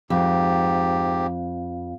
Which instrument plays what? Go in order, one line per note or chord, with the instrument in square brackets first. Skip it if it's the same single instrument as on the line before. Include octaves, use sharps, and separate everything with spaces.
[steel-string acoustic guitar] F2 [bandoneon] G#2 G4